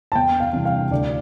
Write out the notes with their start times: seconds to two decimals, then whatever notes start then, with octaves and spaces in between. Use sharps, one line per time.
0.12 A5
0.15 E2 G5
0.40 F5
0.53 C3 E3 G3
0.65 F5
0.91 D2 D5